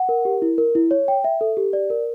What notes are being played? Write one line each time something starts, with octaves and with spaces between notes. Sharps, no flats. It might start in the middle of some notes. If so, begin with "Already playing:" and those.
Already playing: F#5
A#4
G4
E4
A#4
E4
C#5
G5
E5
A4
G4
D5
A#4